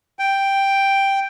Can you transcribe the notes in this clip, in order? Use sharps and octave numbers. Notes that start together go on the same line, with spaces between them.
G5